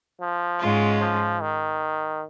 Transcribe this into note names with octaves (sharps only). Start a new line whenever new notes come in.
F3
G#2 G#3 C#4 F4
F3
D#3